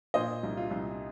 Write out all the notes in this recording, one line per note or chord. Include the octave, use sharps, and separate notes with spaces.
A#2 C5 D#5
C2
F4
C2